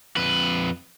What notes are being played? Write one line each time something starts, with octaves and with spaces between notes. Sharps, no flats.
F2 B4